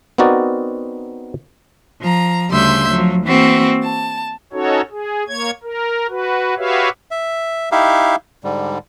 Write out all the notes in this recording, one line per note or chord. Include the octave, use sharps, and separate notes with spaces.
B3 C4 D#4 F#4 A#4 D5
F3 A#5
D2 C#3 G3 E5 C6 G6
F3 F#3
E3 A#3 C4 F#4
A5
C#4 D#4 F#4 A4 C#5
G#4
A#3 C#5 G#6
A#4
F#4 B4
F#4 G4 B4 C#5 E5 F5
E5
D#4 E4 G4 E5 F5
G#2 D3 G3